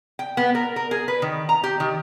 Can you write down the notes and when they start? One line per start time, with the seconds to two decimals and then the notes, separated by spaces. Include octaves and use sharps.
0.19 G5
0.37 B3
0.55 A#4
0.76 A#4
0.91 G#4
1.08 B4
1.22 D#3
1.49 A#5
1.64 G4
1.80 D#3